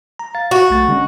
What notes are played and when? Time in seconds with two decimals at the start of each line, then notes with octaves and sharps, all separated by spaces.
0.19 A#5
0.35 F5 A6
0.51 F#4
0.70 B1 A3 A6
0.88 D3 G#3 C#4